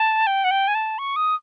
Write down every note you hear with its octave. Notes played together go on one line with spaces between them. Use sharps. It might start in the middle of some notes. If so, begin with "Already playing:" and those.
Already playing: A5
G5
F#5
G5
G#5
A5
C#6
D#6